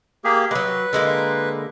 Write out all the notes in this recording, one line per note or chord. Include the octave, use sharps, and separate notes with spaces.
A#3 G4 G#4
F#3 G#3 B4
D3 G#3 A#3